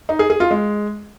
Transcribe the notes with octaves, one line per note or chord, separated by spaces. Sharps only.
D#4
G#4
G#4
F4
G#3